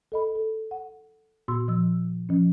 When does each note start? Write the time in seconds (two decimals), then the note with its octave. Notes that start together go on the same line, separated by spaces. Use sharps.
0.12 A4 D#5 B5
0.36 A4
0.71 F#5
1.48 A#2 B3 F#4 C6 E6
1.68 F3 E6
2.29 F3 C#4